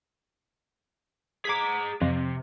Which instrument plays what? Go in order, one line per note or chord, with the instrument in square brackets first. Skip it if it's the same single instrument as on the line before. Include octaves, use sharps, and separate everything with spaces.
[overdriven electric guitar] G#4 A#5 [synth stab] D6 G#6 B6
[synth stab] F2 [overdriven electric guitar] C3